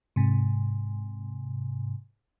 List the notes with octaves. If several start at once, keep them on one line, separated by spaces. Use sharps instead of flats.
G#2 C3